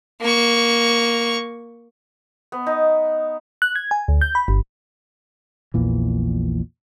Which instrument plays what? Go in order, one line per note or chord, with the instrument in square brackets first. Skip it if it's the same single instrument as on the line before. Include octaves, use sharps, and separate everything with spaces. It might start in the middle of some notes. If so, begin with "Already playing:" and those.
[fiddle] A#3 C#6
[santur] B3
D#4
[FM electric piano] F#6
G#6
G#5
D2
G6
B5
G1
[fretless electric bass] A#1 E2 A#2 E3